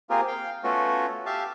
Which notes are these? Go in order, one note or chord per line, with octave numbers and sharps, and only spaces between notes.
A#3 C4 F4 G4 G#4 A#4
F5 G5
A3 B3 C#4 F4 F#4
G4 E5 F5 A5